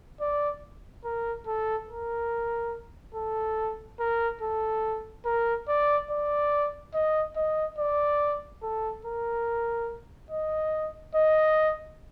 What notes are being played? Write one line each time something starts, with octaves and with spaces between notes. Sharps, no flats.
D5
A#4
A4
A#4
A4
A#4
A4
A#4
D5
D5
D#5
D#5
D5
A4
A#4
D#5
D#5